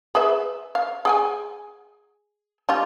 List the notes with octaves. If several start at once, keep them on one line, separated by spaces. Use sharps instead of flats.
G#4 B4 E5
F5
G#4 G5 G#5
G3 D#4 F4